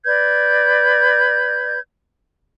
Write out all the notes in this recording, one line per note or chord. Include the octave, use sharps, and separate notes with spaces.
B4 D5 G6 G#6